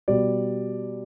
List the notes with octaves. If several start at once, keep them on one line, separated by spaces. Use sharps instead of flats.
B2 G3 D5